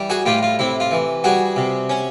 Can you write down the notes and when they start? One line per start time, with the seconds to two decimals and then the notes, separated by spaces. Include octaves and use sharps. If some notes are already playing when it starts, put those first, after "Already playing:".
Already playing: E3 G3
0.10 F#4 G#4
0.26 A2 F4 G4
0.43 F4
0.59 C3 E4
0.80 F4
0.91 E3
1.24 G3 F#4 G#4
1.56 C3
1.90 C#4